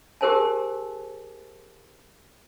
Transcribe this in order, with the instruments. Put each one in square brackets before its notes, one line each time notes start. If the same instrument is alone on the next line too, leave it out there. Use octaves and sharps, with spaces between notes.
[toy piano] G4 G#4 A#4 C5 G#5 A5